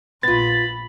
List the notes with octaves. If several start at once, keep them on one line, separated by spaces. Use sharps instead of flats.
A#1 B3 F4 B5 A6